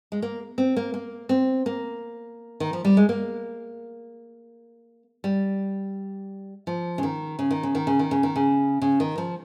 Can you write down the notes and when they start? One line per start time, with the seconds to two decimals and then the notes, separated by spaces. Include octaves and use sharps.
0.12 G#3
0.22 A#3
0.58 C4
0.76 A#3
0.94 A#3
1.29 C4
1.66 A#3
2.60 D#3
2.73 F3
2.85 G3
2.97 G#3
3.09 A#3
5.24 G3
6.67 F3
6.98 C#3
7.03 D#3
7.39 C#3
7.51 D#3
7.63 C#3
7.75 D#3
7.87 C#3
7.99 D#3
8.11 C#3
8.23 D#3
8.36 C#3
8.82 C#3
9.00 D#3
9.18 F3